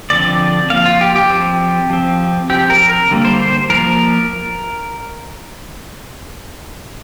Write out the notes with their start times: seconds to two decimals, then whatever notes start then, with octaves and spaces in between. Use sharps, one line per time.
0.10 D3 F3 C4 D5
0.70 F3 A#3 F5
0.85 F4
1.01 G4
1.16 G4
1.30 F3 C4
1.90 F3 C4
2.50 F3 C4 G4
2.70 A#4
2.89 A#4
3.10 D3 G3 A#3
3.25 C5
3.40 C5
3.70 F3 A#3 A#4